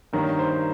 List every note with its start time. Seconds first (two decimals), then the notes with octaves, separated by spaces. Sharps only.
0.13 G2 D#3 A#3 C#4
0.39 C5